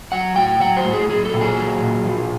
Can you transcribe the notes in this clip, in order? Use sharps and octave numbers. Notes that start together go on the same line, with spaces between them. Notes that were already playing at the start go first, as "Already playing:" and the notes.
F#3 F#5
A2 G5
F#3 F#5
C5
A2
G#4
F#3 G#4
A4
A#2
G#4
F#3
A#2
F3